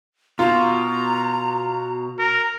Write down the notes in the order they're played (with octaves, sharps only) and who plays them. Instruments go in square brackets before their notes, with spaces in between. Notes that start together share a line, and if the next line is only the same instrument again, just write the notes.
[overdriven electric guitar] B2 [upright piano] F4 [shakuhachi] A#5
[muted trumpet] A#4